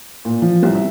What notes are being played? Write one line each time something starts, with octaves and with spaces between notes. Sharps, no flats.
A#2
F3
C2
E5